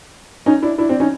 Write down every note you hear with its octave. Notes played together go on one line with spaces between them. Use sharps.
C#4 D#4
D4 E4
D4 E4
C4 D4
C#4 D#4